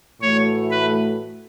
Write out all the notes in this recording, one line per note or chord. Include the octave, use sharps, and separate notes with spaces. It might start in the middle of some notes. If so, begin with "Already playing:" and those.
A2 E3 A3 F#4 C#5
B4